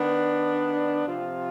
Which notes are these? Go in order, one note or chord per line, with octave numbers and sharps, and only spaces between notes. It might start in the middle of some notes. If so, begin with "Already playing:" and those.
Already playing: D#3 B3 D4
C3 F3 C4 F4